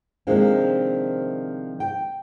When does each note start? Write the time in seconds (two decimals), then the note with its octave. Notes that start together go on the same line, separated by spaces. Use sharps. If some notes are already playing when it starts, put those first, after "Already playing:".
0.27 C3 D#3 F3 G#3 A#3 D4
1.80 G5